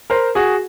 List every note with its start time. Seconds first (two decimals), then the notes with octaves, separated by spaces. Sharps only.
0.10 A#4 C5
0.35 F#4 G#4